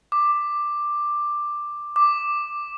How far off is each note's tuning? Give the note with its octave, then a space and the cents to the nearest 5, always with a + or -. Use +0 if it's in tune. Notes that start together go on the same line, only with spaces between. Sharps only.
D6 +10
D6 +5